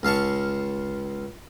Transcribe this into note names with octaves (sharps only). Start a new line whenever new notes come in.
C#2 F5 A5 C#6